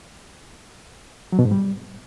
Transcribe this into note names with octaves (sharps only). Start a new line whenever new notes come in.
F#3
B2
G#2
G3